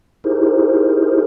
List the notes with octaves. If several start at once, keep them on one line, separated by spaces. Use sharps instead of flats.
D#4 E4 G4 G#4 A#4 C5